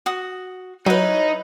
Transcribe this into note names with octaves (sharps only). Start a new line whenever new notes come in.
F#4 D#6
F#3 D#4 E4 B4 C#5